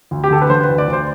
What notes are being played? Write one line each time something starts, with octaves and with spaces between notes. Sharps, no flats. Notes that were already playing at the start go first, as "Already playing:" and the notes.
D2
G4
D3 A4
B4
D3 C5
B4
D2
D5
D2
C5